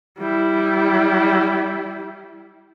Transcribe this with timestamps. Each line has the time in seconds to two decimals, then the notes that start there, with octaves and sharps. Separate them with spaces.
0.18 G3 E4